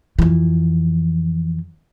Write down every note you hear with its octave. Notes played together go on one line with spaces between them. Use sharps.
F2 E3